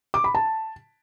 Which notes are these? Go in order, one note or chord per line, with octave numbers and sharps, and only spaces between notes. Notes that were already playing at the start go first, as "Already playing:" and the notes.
D6
B5
A5